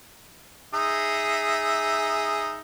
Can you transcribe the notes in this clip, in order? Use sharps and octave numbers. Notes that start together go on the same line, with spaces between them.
D#4 G#4 E5